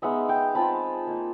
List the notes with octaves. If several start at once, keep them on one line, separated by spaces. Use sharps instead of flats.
G#3 B3 D#4 E5 F#5
F5 G5
G#3 C4 F4 A5 B5
A#3 D#4